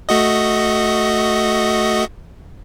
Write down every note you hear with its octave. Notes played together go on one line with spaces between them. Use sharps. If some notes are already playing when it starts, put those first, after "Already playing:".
A3 F#4 D#5